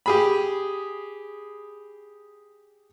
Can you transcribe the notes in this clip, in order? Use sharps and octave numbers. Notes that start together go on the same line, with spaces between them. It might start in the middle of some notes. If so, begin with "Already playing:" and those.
G4 G#4 B5